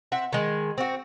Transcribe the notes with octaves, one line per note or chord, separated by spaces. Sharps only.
C4 E5 F#5
D#3 G#3
C4 F#4